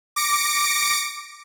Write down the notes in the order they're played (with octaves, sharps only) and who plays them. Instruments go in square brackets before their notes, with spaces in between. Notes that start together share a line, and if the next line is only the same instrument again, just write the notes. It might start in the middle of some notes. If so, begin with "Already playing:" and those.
[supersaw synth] D6 A#6 C#7 D7